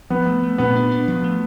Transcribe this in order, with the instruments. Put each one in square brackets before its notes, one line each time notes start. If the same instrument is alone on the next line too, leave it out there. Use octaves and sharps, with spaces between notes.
[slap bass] F3 [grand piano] B3
[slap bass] A3
A3
[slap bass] A#2 [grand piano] B3
[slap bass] D4
D4
F3
A3